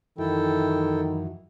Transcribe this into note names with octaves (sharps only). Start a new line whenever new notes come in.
F#2 D#3 E3 E4 A4 G5